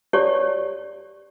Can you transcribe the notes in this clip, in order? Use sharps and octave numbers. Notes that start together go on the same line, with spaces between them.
G4 C#5 D5